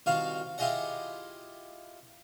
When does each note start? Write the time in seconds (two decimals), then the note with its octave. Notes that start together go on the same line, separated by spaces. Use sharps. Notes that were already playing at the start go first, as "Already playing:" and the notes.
0.06 C2 D#3 F4 F#4 F5
0.58 E4 F4 G4 G#4 D#5 F#5